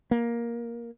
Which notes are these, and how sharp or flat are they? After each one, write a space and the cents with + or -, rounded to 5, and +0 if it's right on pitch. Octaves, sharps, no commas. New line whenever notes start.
A#3 +10